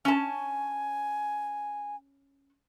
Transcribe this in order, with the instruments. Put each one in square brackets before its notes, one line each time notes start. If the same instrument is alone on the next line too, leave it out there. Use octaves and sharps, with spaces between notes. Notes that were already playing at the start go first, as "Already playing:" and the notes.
[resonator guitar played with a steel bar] C#4 A5 [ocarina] G#5